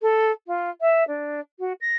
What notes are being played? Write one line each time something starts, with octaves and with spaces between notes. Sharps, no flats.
A4
F4
E5
D4
F#4
A#6